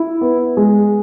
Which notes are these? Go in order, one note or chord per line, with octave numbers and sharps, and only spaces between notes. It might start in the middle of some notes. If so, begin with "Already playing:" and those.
Already playing: E4
B3
G#3